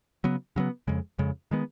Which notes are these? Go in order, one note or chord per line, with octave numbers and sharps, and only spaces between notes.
C#3 F#3 B3
C#3 F#3 B3
F2 C#3 G#3
F2 C#3 G#3
D#3 G#3 B3